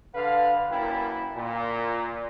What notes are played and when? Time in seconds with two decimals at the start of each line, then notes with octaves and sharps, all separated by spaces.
0.14 D3 B4 F5
0.71 F#2 A#3 E4 G5 B5
1.36 A#2